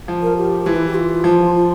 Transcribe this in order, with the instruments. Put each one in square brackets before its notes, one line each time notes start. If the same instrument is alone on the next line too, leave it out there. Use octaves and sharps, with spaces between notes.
[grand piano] F3
[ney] A#4
G4
[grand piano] E3 [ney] F4
[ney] E4
G4
F4
[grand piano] F3
[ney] F4